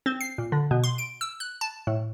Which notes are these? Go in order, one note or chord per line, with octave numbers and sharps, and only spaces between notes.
C4
C7
A#2
D3
B2
C6
D7
E6
F#6
A5
A2